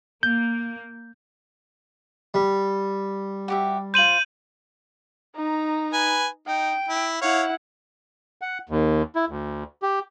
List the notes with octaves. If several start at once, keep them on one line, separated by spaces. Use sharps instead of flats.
A#3 G6
G3
F#4 G4 E5
F4 C5 G6 D#7 F#7
D#4 A#5
B4 G#5
D#4 G5
E4
E4 C#5 F5 F#5
F#5
D#2
E4
D2
G4